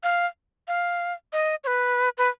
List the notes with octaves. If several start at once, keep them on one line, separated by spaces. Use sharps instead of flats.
F5
F5
D#5
C#5
B4
B4